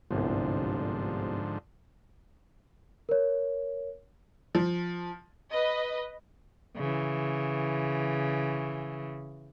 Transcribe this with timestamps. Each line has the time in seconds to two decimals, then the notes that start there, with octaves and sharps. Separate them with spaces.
0.11 G1 C2 G#2 D3 F3
3.09 A#4 C#5
4.55 F3
5.51 B4 D#5
6.77 C#3 E3